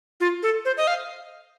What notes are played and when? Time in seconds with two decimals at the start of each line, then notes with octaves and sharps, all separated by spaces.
0.20 F4
0.43 A4
0.65 C5
0.77 D#5
0.87 F5